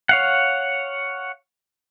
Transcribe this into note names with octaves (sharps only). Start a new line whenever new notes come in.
C#5 F5 F#5